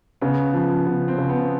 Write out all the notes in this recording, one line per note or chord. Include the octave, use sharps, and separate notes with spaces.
C#3 B3
F3
C#3 B3
C4
C#3
B3